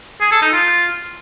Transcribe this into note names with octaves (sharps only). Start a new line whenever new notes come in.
G#4
A4
D#4
F4